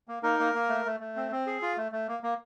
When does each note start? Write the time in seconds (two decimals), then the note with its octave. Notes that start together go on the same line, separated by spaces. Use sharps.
0.08 A#3
0.23 A#3 D#4 A#4
0.39 A#3
0.55 A#3
0.69 A3
0.86 A3
1.00 A3
1.16 C4
1.32 C4
1.47 G#4
1.62 F4
1.77 A3
1.92 A3
2.08 A#3
2.23 A#3